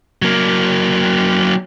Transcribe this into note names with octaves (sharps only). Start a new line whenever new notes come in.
F#3 A#3